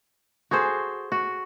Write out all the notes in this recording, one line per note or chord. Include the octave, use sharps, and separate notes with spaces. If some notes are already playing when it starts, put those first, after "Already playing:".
F#4 G#4 A4 C5
F#4